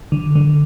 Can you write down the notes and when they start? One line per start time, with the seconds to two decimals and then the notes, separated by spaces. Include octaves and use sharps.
0.12 D3
0.35 D3